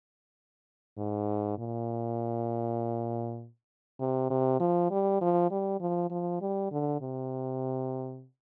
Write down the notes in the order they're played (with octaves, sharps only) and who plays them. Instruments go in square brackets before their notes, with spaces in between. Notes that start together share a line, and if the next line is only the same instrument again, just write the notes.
[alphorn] G#2
A#2
C3
C3
F3
G3
F3
G3
F3
F3
G3
D3
C3